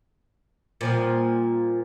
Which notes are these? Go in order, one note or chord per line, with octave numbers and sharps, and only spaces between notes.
A#2 F3 G3